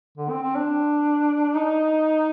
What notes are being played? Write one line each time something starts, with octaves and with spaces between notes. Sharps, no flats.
D3
C4
C4
D4
D#4